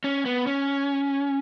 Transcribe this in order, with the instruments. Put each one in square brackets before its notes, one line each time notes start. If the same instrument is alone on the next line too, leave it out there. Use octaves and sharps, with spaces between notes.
[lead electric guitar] C#4
B3
C#4